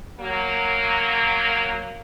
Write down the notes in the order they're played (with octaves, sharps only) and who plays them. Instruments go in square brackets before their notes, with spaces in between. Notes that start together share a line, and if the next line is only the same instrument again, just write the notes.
[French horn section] F#3 A#3